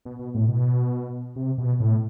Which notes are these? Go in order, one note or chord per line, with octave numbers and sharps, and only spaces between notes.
B2
B2
A2
B2
C3
B2
A2